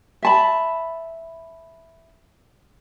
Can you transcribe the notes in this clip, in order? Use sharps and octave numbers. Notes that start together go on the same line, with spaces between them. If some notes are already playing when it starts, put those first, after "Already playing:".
E5 A5 B5